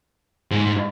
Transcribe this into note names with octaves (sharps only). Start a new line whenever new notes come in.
G#2